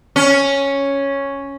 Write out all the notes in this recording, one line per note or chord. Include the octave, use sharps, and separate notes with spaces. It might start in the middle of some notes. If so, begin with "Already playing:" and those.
C#4